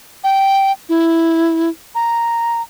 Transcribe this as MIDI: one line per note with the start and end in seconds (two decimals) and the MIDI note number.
0.24 0.72 79
0.89 1.69 64
1.95 2.62 82